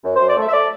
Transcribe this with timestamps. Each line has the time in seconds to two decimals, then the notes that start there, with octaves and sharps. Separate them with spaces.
0.04 F#2
0.15 F#2 C5
0.28 D5
0.36 A3 E5
0.48 E5
0.53 A3 D5